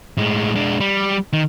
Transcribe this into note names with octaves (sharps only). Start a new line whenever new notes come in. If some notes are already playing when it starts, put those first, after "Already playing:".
A2 G#3
G#3 D4
G3
D#3